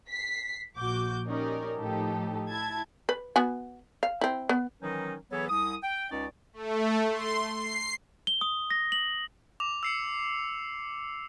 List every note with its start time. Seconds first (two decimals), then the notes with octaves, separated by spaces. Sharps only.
0.10 B6 C7
0.76 A#1 F#4 D6 G6
1.26 C#4 D#4 G4 A#4 D5
1.78 A2 F3 D#4 G4 A4
2.49 E4 A5 G#6
3.09 B4
3.36 B3 F#4 G#5
4.03 F5
4.21 C4 E4
4.49 B3
4.82 D#3 E3 F#3 C#4 D#4
5.32 E3 F#3 B3 G#4 A4 C#5
5.49 C2 D#6
5.83 G5
6.12 C#2 C#4 D#4 D5
6.53 A3
7.12 C6
7.50 C7
8.27 G7
8.41 D#6
8.70 A#6
8.92 F#7
9.60 D6 F7
9.83 E6 C7 C#7